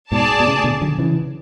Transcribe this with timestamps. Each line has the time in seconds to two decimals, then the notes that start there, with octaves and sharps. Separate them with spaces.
0.12 G#2 B2 G#4 D5 A5
0.40 B2
0.46 A2 C#3
0.64 B2 D3
0.82 D3 F#3
0.99 C#3 E3